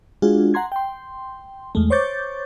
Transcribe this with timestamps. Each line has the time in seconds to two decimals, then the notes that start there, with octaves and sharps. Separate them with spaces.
0.22 G#3 D4 F4 F#4 G#4
0.54 F#5 A#5 C6 G#6
0.72 G5 C6
1.75 E2 G#3 A3
1.90 C5 C#5 C#6 D6 G6 A6